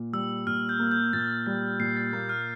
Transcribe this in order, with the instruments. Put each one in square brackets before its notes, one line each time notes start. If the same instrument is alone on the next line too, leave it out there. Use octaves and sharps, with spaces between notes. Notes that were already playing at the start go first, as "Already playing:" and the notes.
Already playing: [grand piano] A#2
[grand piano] G3 [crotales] E6
[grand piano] A#2 [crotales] F6
[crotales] G6
[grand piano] A#3
[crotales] G6
[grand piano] A#2 [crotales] A6
[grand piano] G3 [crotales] A6
[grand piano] A#2 [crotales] C7
[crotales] A6
[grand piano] A#3 [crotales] G6
[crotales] F6